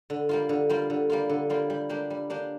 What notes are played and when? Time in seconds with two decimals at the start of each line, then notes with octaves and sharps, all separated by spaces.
0.10 D3
0.29 G3 A#3 F4
0.49 D3
0.69 G3 A#3 F4
0.90 D3
1.10 G3 A#3 F4
1.29 D3
1.50 G3 A#3 F4
1.70 G3
1.89 A#3 D4 G4
2.10 G3
2.30 A#3 D4 G4